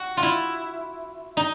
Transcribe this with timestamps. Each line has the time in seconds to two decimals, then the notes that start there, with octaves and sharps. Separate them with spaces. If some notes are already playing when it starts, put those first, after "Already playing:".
Already playing: F#4
0.17 F4
0.23 E4
1.37 D#4